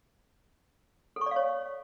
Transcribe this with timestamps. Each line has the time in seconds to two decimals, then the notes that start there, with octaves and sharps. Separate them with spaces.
1.16 A4
1.21 C#6
1.26 D5
1.31 F5
1.36 C#5